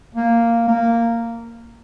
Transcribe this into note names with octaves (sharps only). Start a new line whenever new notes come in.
A#3
A#3